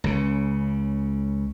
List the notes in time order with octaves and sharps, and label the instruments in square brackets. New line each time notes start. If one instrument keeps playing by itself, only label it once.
[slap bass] C#2 C#3